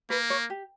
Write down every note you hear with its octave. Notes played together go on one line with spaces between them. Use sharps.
A#3 B4
C#5
G4